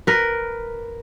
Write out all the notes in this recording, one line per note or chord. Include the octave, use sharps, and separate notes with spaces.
A#4 B4